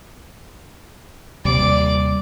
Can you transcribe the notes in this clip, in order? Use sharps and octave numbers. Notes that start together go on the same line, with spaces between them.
D#2 C3 G3 D5 D6